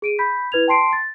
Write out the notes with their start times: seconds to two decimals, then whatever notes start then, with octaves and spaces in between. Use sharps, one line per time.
0.02 G#4 D7 D#7
0.19 B5 G6 B6
0.52 E4 B4 G#6 F7
0.68 G5 A5 C6 C7 D7
0.93 A6